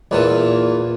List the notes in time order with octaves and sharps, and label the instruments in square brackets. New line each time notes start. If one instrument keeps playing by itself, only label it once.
[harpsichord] E2 A#2 E3